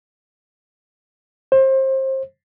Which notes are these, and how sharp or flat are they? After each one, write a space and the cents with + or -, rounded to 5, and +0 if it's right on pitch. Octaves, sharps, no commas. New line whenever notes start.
C5 +25